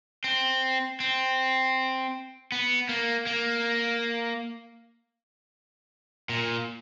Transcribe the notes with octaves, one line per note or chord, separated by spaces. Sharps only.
C4
C4
B3
A#3
A#3
A#2